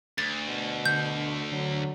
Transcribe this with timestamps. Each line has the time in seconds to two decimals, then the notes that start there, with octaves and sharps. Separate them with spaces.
0.18 D2 A6
0.48 B2
0.85 D3 G6
1.52 D3 F#3